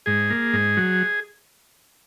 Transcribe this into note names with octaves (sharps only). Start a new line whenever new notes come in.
G#2 G#4
A#3
G#2
F#3